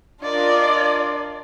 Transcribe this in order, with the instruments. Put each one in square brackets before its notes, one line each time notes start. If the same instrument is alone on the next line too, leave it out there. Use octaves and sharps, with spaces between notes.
[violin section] D4 F4 A#4 D#5 [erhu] D5